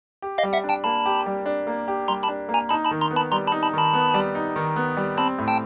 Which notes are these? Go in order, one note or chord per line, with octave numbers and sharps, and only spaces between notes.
G4
D#5 F5
G3
E5 F#5
D4
G5 A5
A#3 A5 B5
G4
G3
D4
A#3
G4
G3 A#5 C6
A5 B5
D4
A#3
G#5 A#5
D#4 A5 B5
A5 B5
D#3
A#5 C6
B3
A5 B5
G3 A#5 C6
A5 B5
D#4
A5 B5
D#3 A5 B5
B3
G3
D#4
D#3
B3
G3
C4 A5 B5
A2
G5 A5